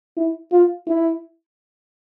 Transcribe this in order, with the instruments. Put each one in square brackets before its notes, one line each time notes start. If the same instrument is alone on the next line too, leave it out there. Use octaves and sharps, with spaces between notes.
[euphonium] E4
F4
E4